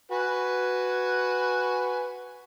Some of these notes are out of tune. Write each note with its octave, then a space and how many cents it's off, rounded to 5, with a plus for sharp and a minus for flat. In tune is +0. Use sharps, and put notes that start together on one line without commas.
F#4 +0 B4 +0 G#5 +0